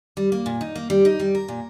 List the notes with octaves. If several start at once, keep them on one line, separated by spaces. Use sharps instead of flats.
G3
A#3
A#2
D#4
A#3
G3
D#4
G3
A#4
A#2